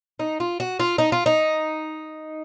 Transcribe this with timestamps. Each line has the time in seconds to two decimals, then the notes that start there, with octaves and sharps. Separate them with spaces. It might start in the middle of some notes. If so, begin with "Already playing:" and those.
0.19 D#4
0.40 F4
0.60 F#4
0.80 F4
0.98 D#4
1.12 F4
1.26 D#4